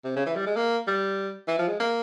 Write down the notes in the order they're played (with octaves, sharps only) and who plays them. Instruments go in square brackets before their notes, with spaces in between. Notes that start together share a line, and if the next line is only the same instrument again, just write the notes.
[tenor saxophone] C3
C#3
E3
G3
G#3
A#3
G3
E3
F3
G#3
A#3